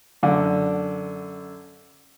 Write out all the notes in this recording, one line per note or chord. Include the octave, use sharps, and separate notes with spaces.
F#2 D3